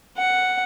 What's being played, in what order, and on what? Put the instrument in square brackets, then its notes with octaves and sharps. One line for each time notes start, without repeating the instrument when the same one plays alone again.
[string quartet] F#5